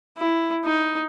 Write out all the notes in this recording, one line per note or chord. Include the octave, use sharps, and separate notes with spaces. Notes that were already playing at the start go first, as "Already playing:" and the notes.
E4
D#4